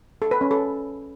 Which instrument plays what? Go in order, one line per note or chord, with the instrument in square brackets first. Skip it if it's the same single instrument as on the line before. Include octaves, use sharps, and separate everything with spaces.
[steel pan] A4
B4
C#4
A4